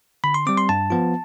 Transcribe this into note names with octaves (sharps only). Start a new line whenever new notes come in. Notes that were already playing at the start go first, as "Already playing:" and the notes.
D3 B5
C6
G3 C4 D6
C6
G2 A5
F3 B3 F4